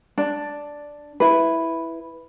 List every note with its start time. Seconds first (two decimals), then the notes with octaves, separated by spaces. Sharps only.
0.18 D4
1.20 E4 B4